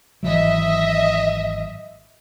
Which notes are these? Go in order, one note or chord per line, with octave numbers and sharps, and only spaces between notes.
G#1 E3 F#3 D#5 E5